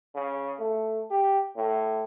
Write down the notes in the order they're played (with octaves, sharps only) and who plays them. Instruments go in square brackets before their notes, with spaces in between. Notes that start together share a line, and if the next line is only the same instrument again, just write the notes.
[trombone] C#3
A3
G4
A2